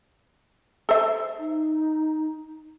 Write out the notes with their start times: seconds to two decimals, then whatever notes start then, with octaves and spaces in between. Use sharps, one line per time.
0.89 A4 C5 E5
1.39 D#4